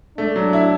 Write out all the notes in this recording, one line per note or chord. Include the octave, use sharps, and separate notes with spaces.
A3 D4
F#3
E4